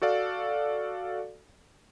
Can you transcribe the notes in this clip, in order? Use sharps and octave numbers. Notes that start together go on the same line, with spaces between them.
F#4 A4 D5 F5